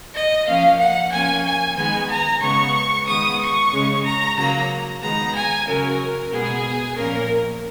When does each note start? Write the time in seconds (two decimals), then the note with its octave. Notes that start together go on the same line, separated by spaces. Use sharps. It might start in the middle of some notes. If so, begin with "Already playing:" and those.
0.14 D#5
0.47 F3 A#3 C#4 F5
0.80 F#5
1.12 F3 A#3 C#4 G#5
1.44 G#5
1.76 D#3 G#3 B3 G#5
2.09 A#5
2.41 C#3 G#3 B3 C#6
3.06 D#3 G#3 B3 D#6
3.39 C#6
3.71 C#3 G#3 C#4
4.04 A#5
4.36 C#3 F#3 A#3 A#5
5.01 D#3 G#3 B3 A#5
5.34 G#5
5.66 C#3 F#3 C#4 A#4
6.32 B2 G#3 B3 G#4
6.96 A#2 F3 A#3 C#4 A#4